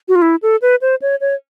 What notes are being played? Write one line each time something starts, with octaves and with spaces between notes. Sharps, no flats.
F#4
F4
E4
A4
B4
C5
C#5
C#5